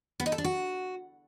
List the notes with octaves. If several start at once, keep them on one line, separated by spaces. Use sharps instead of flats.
B3
D#4
A4
D4
F#4